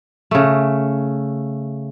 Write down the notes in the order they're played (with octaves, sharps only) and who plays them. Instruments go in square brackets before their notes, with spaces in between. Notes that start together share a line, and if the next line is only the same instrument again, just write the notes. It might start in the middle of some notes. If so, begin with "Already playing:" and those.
[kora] C#3 A3